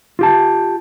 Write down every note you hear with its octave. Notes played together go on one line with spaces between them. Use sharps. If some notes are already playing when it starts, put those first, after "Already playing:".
F4 G4 A5